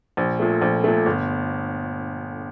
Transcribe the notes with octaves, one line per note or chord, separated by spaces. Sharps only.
A#1
A#2 A3
A#1
A#2 A3
G1